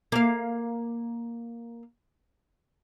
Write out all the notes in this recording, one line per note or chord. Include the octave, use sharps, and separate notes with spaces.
A#3 F5